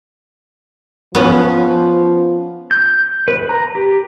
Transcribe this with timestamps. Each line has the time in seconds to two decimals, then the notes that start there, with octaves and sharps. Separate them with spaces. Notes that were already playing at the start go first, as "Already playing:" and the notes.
1.15 F3 B3 C#4
2.71 G6
3.28 B4
3.49 A#5
3.75 G4